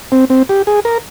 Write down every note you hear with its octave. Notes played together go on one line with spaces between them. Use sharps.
C4
C4
G4
G#4
A#4